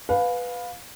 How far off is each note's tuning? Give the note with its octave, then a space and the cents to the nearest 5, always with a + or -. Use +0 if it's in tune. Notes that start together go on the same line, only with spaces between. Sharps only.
B4 +0 F5 +25 G#5 +10